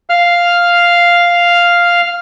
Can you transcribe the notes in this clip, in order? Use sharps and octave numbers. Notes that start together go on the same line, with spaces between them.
F5 F6